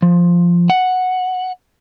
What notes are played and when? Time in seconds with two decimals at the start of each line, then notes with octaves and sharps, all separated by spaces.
0.02 F3
0.70 F#5